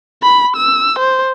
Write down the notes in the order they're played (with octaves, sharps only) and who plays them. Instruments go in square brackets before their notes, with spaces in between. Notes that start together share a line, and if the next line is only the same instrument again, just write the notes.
[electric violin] B5
E6
C5